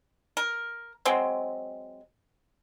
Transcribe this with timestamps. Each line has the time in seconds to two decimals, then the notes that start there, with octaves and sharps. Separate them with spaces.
0.37 A#4
1.05 F#3 G#3 C4